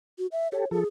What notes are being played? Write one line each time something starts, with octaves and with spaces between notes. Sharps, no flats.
F#4
E5
G4 A4 C#5
F3 G#4 A4